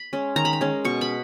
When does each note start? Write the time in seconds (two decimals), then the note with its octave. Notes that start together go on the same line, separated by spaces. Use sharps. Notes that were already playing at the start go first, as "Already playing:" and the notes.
Already playing: B5
0.13 G#3 C#4
0.36 D#3 A#5
0.45 B5
0.53 A#5
0.61 G#3 C#4
0.85 B2 C#6
1.01 B5